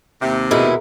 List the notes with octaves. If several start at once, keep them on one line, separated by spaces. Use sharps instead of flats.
D#2 C3 E5
B2 G#3 E4 G#4 A#4 A#5